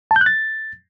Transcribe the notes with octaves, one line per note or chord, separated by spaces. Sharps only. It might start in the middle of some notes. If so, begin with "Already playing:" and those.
A5
G6
F#6
A6